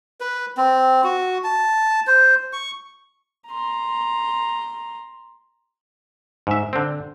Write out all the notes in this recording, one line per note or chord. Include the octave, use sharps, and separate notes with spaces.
B4
C4
F#4
A5
C5
C#6
A#5 C6
G#2 E5
D3 C4